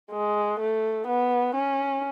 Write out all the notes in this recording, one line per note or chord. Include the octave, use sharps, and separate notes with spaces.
G#3
A3
B3
C#4